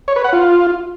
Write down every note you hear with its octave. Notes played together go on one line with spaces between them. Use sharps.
C#5
B4
F#5
F4